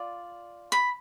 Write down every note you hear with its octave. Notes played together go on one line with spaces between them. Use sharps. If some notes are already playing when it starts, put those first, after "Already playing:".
Already playing: F4 D5
B5